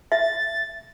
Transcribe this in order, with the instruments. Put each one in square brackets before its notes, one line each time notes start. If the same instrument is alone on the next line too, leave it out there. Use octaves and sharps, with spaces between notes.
[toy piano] E5 [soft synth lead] A6